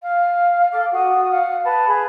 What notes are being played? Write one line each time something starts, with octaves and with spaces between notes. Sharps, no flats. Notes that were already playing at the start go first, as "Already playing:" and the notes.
F5
A4 F5 D6
F#4 D#6
F5 F#5
B4 A5
G#4 B4